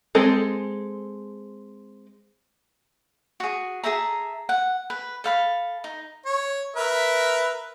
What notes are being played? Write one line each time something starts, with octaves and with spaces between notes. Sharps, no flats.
G#3 C4 G#4 A4
F#4 G#4
G#4 A4 E5 A#5
F#5
B4
A4 F5 B5
D#4
C#5
A#4 B4 E5